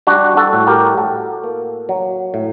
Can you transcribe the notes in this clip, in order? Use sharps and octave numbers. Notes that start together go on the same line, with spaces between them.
G3 D4 F#4
F#4 A4
A2
G4 A#4
A2 F#4 A4
A#3
F#3
A2